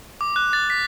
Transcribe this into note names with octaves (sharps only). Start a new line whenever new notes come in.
D6
F#6
A6
B6